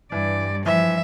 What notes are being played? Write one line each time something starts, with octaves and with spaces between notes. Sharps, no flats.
G2 E3 D5
E3 F3 E5